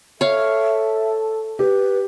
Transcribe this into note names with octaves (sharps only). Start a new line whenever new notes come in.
A4 C#5 E5 F5
G4 B4